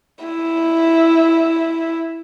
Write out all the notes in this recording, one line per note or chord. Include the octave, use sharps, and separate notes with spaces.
E4